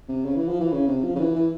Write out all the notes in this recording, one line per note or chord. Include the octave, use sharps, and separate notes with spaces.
C3
C#3
E3
F3
E3
C#3
C3
F3
C#3
E3
E3